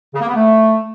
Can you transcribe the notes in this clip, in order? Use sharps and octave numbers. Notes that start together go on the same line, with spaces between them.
C#3
A#3
B3
A3